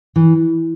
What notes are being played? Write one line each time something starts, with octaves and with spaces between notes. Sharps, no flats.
E3